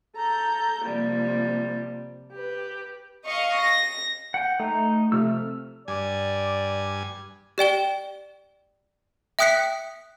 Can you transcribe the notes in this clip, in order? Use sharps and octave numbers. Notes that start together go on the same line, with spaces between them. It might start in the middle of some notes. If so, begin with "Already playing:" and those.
A4 A#5 G6
C3 F3 G3 A#3
G4 B4
D#5 F5 C#6
A#6
F#5 G5
A3 D#4
C3 F3 A3 E6 F6
G2 D5 G#5
G4 D5 G5 G7
E5 G5 D#6 F#6 B6 C#7